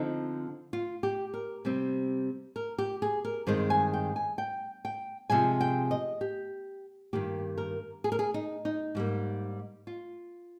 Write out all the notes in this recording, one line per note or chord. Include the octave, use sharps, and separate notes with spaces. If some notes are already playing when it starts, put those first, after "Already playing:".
Already playing: D3 F3 C4 D#4
F4
G4
A#4
C3 G3 C4
A#4
G4
G#4
A#4
G2 D#3 G#3 C4 C5
G#5
G5
G#5
G5
G5
C3 F3 G#3 G#5
G5
D#5
G4
G2 D#3 A#3 G4
A#4
G#4
A#4
G#4
D#4
D#4
G#2 G3 A#3
F4